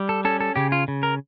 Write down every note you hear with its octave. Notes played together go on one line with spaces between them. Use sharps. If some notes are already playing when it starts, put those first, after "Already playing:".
Already playing: G3
A4
C#4 A4
A4
C#3 G4
F4
C#3
A#4